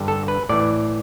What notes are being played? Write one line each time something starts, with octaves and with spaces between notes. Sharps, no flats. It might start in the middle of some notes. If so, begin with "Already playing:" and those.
Already playing: G2 D3
A4
B4
A2 E3 D5